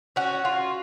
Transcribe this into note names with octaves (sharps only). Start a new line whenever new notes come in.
C#4 F#4
F4